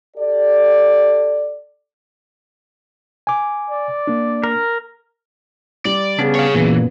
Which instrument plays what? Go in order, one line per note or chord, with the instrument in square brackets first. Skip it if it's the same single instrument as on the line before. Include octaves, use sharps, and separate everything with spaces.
[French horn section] G4 A4 D5
[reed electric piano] G#5 D6
[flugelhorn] D5
[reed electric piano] A#3 D4
[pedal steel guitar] A#4
[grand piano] G3 [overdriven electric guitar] D5
[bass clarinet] C#3 [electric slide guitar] B3 C#4 D4
[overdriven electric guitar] C#5 F5
[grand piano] F#2 B3 [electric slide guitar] A#2 [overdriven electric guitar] E3